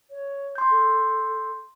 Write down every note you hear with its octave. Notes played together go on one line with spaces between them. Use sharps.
C#5
C6 G6
A4